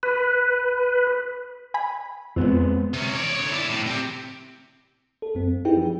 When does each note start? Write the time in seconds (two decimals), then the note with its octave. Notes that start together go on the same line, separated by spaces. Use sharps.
0.03 B4
1.74 G#5 B5
2.36 F2 G#3 B3 C4
2.94 C3 C#4
3.15 C#5 D5
3.35 D3 C#5
3.52 E4 D5
3.70 A2
3.86 C4 G4
5.22 A4
5.35 F#2 C4
5.65 D#4 E4 G4 G#4 B4 G5
5.77 F3